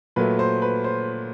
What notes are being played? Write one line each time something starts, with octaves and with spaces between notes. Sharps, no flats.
A#2 F#3 A3 B4
C5
B4
C5